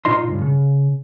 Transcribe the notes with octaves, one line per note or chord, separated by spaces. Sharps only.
A#2 D#4 F4 D#5 C6
C#2 G2
C#3